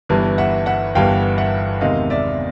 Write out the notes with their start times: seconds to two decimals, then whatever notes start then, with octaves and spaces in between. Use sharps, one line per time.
0.09 G1 G2 E3
0.38 E5 F#5
0.66 E5 F#5
0.95 G1 G2 E3 F5 G5
1.38 E5 F#5
1.81 E2 C3 D#3 G#3 D#5 F5
2.10 D5 E5